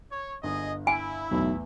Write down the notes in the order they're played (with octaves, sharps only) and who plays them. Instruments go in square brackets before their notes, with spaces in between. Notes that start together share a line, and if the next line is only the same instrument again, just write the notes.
[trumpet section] C#5
[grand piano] G1 [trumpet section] G#4 D#5
[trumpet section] E4 [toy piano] G#5
[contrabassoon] B1 [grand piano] E2 A2